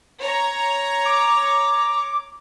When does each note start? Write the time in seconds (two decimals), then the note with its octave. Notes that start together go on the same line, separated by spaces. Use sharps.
0.21 C#5 A#5
1.06 D6